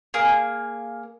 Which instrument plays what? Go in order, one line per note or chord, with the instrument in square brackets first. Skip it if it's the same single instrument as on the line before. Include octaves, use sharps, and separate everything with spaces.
[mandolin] A#3 G#4